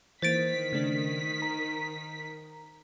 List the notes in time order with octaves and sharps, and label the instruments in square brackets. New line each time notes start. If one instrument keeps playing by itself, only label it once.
[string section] D#3 B6 [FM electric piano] E3 A#3 [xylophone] C5 A6 D7
[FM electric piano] C#3 A3 D4
A#5